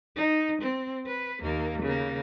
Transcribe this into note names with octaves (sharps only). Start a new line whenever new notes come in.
D#4
C4
B4
D#2 A#3
C#3 A#3